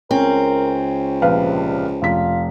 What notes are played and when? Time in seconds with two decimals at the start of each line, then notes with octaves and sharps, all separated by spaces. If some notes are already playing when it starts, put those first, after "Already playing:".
0.11 C#2 C4 C#4 A#4
1.22 A#1 C3 B4 F5
2.02 F1 F4 B6